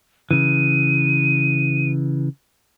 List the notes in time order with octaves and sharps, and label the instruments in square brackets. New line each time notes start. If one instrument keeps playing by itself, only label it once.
[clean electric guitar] C#3 E3 [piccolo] D#7